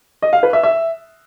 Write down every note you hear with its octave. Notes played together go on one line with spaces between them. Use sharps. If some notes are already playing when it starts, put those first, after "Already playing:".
D#5
F5
B4
E5
E5